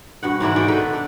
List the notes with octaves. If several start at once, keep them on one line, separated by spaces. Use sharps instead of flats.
G2 B2 F#5
G#2 E3 D4 E4
D#3 G#3 F#4 D5
D#3 A4 B4
D4